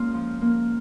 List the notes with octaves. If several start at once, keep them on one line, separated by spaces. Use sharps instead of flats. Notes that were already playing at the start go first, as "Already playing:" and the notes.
Already playing: G#3 A#3 C#4 F4
F3
A#3